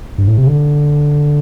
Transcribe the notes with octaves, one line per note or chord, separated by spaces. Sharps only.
G2
A2
C3
D3